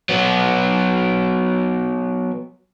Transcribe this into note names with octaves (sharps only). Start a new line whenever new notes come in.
F#3 B3